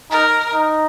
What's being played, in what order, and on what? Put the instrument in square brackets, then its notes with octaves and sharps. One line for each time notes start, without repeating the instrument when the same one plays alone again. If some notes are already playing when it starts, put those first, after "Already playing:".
[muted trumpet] D#4 [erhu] A#4
[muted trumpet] D#4